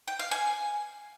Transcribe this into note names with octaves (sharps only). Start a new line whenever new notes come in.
G5
F5
G#5